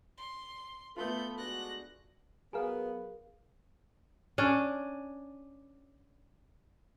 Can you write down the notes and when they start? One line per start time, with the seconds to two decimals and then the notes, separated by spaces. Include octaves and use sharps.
0.18 C6
0.96 A3 B3 F4 A4 B4 B5 G6
1.38 G#3 D4 F#4 F#6 A#6
2.53 F#3 B3 G#4 A#4 F5
4.38 C#4 D4